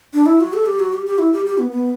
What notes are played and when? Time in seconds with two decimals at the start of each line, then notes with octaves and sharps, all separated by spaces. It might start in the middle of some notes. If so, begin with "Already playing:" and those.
0.14 D4
0.26 E4
0.40 F#4
0.54 A4
0.66 G4
0.79 F#4
0.93 G4
1.06 G4
1.18 E4
1.33 G4
1.46 G4
1.58 B3
1.71 B3